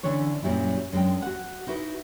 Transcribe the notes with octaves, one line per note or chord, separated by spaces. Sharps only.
D3 E3 C#4 D4 C#5
F#2 A#2 F#3 G3 E4
F#2 G#3 D4 G5
F#4 F#5
D#4 E4 F#4 B4